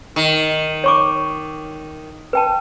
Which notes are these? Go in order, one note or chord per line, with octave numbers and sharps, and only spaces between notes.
D#3
C#5 C#6 D6
B4 G5 A5